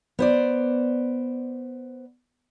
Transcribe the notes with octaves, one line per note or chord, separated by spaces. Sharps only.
B3 C5 D5